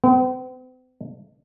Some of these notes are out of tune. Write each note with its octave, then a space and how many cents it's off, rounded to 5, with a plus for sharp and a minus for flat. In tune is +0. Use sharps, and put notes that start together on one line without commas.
C4 -45